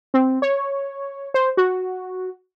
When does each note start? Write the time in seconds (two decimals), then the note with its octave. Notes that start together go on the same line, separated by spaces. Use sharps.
0.14 C4
0.42 C#5
1.34 C5
1.57 F#4